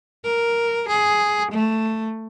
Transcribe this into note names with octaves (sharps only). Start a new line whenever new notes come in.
A#4
G#4
A3